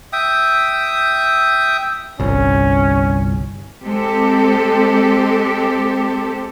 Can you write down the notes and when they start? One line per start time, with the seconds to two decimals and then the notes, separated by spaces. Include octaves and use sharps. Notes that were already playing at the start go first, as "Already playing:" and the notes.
0.13 E5 G5 D#6
2.20 G1 C2 C#4
3.83 G#3 C4 G4 A4